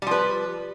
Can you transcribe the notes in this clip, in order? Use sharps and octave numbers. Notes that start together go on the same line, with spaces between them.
F3 G3 B4